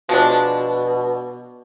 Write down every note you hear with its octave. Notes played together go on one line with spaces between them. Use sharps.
B2 F3 G#3 D4